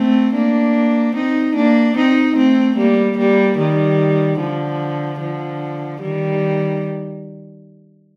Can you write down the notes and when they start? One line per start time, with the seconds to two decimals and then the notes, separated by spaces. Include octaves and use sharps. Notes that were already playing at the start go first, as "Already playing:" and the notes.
Already playing: A3 C4
0.34 A#3 D4
1.15 C4 D#4
1.55 A#3 D4
1.96 C4 D#4
2.36 A3 C4
2.77 G3 A#3
3.18 G3 A#3
3.58 D#3 G3
4.39 D3 F3
5.20 D3 F3
6.01 D#3 G3